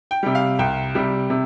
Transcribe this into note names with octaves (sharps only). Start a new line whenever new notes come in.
G5
C3 G3
F5
C2 G5
C3 G3
C3